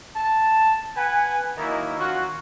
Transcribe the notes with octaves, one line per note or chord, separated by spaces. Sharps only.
A5
B4 F#5 G#5
D#3 F#3 A#3 D#4 E4
D#3 C#4 F4 F#4